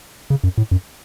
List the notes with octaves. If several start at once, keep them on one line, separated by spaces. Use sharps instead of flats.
C#3
F#2
A2
F#2